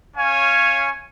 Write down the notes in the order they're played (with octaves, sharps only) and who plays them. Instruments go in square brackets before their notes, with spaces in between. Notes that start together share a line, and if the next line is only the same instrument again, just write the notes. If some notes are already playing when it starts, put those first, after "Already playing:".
[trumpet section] C#4 C#5 F5 G#5